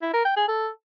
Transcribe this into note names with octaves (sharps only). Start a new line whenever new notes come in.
E4
A#4
G5
G#4
A4